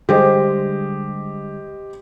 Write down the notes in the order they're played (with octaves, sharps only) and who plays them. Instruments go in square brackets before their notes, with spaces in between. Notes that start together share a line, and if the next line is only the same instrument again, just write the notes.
[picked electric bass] D3 G3 G#3 [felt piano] G4 C5 D#5